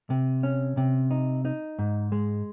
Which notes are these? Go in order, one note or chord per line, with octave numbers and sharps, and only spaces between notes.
C3
C#4
C3
D#4
D#4
G#2
G#3